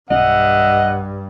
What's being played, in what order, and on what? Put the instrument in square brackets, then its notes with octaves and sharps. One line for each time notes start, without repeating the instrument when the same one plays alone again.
[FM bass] B1 [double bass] G2 [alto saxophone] D#5 [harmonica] E5 F#5